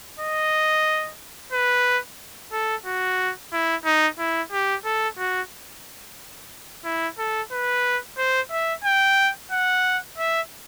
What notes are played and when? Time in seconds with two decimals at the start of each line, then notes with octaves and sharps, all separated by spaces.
0.19 D#5
1.52 B4
2.52 A4
2.86 F#4
3.52 E4
3.85 D#4
4.19 E4
4.52 G4
4.85 A4
5.18 F#4
6.84 E4
7.18 A4
7.52 B4
8.17 C5
8.51 E5
8.84 G5
9.51 F#5
10.18 E5